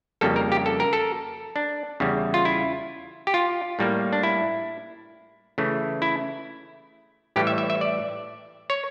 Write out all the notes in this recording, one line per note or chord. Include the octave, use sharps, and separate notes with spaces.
F2 C#3 G3 A#3 A4
A#4
G4
A4
A#4
A4
D4
E2 C#3 G3
F4
E4
G4
F4
A2 G3 A#3
D4
E4
C#3 E3 A3
E4
A2 E3 G3 G4
E5
E5
E5
D5
C#5